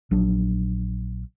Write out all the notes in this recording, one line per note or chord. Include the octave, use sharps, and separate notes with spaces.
A#1 F#3 D4